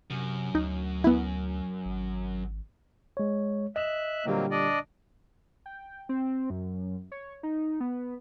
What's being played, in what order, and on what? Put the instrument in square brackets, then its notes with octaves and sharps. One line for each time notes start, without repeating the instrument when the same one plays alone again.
[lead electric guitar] F#2 [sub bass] C3
[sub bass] D2 [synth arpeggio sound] D#4
[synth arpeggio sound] B3 E4
[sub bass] G#1
[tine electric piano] G#3 C#5
[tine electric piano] D#5 [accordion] E5 F#6 [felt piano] E7
[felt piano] A#2 D3 G3 [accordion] F#3 A#3 C4
[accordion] D4 D5 D#5
[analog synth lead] G5
C4
F#2
C#5
D#4
B3